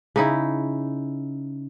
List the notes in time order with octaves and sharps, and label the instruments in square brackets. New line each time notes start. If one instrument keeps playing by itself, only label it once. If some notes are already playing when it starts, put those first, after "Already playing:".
[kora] C#3 D#4 E4